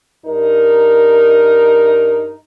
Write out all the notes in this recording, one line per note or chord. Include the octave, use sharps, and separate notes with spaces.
G2 D#4 A#4